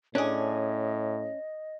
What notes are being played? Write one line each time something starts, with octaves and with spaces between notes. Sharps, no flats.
A2 C#4 D4 G#4 D#5